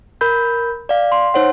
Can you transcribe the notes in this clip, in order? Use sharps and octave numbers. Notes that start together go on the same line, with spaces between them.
A#4 B5 G6
D5 F5
C6
D#4 C5 C#5 F#5